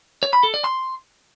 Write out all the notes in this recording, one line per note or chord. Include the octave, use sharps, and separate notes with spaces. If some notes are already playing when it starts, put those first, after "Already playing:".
C#5
B5
A4
D5
C6